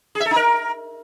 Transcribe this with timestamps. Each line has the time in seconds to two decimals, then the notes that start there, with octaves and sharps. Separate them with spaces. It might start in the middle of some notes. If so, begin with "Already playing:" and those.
0.15 G#4
0.20 E5
0.26 A4
0.31 D#4
0.36 A#4